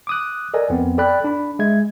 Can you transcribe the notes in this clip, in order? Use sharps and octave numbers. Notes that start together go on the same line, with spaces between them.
D6 D#6 F#6
A4 A#4 D5 D#5 G#5
F2 B3 C4
A4 D5 G5 B5 F#6
D4 B5
G#3 E5 G#6